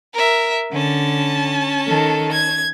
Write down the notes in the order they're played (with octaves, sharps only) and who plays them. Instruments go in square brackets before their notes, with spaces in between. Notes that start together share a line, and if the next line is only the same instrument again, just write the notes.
[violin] A#4 E5
[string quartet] D3 [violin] C#4 A5
[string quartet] D#3 A4
G#6